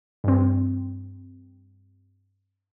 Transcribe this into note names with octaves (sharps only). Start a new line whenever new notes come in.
G2 C4